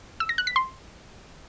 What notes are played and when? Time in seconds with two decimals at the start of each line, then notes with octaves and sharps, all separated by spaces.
0.20 E6
0.29 A#6
0.38 F#6
0.47 B6
0.56 C6